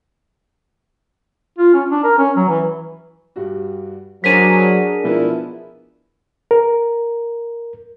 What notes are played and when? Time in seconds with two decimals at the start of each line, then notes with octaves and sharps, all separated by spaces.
1.59 F4
1.74 C#4
1.90 D4
2.04 A#4
2.19 C#4
2.37 F#3
2.49 E3
3.36 G2 G3 F#4
4.24 F#3 D4 G#4 A#4 C5 D5 B6 D#7
5.04 B2 F3 B3 E4
6.51 A#4